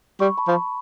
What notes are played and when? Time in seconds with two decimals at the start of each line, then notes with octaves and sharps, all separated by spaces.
0.20 G3 B5 C#6
0.38 A5 B5
0.47 F3
0.56 B5 C#6